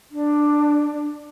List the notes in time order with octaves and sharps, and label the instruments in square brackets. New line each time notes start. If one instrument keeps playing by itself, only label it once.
[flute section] D4